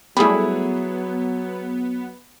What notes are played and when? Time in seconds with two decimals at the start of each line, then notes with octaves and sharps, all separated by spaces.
0.17 F#3 G3 A3 B3 E4 G#4 B5